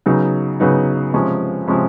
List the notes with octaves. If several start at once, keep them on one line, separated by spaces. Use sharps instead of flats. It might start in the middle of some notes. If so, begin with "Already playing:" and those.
C#3 F#3 B3 D#4
C#3 F#3 B3 D#4
C3 F3 G#3 C#4
C3 F3 G#3 C#4